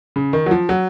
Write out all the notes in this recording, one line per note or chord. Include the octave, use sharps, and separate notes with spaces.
C#3
D#3
F#3
F3
F#3